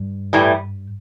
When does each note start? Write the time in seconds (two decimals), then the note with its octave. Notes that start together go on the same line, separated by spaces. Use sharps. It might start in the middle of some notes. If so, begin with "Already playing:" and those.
Already playing: G2
0.33 A2 E3 G3